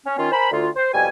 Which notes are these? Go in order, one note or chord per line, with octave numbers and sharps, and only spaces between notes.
C#4
D#3 C#4 F4
A#4 C5 G#5 B5
D2 F4
C5
F2 B2 G3 G#5